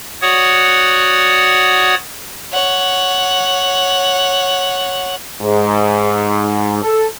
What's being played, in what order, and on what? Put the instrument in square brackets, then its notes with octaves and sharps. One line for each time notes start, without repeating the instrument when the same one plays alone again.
[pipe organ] F#4 C#5 D5 F#5 D#6
[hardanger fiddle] C#5 F#5
[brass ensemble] G#2
A4